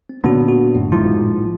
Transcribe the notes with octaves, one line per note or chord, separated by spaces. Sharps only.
C4
A#2 D3 B3 C#4 F#4
F#4
G#1 F#2 A2
A#1 G#2 F3 E4
A2